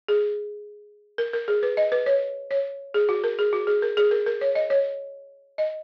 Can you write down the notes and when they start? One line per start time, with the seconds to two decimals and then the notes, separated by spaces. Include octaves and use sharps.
0.08 G#4
1.18 A#4
1.33 A#4
1.48 G#4
1.63 B4
1.77 D#5
1.92 B4
2.06 C#5
2.51 C#5
2.94 G#4
3.09 F#4
3.24 A#4
3.39 G#4
3.53 F#4
3.67 G#4
3.82 A#4
3.97 G#4
4.11 A#4
4.26 A#4
4.41 C#5
4.55 D#5
4.70 C#5
5.58 D#5